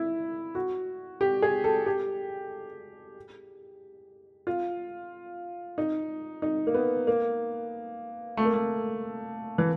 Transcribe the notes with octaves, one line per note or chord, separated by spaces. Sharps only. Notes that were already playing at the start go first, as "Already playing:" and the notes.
Already playing: E4
F#4
G4
G#4
A4
G4
F4
D#4
D#4
A#3
B3
A#3
A3
A#3
A3
E3